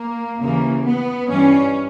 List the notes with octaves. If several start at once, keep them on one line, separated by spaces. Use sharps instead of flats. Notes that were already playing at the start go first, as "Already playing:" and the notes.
Already playing: A#3
D#2 C#3 E3 A#3
B3
G2 E3 G3 C#4